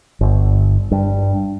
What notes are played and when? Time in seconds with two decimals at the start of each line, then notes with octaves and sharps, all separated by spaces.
0.21 G1
0.92 G2